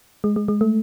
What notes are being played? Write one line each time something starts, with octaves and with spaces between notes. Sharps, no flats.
G#3
G#3
G#3
A3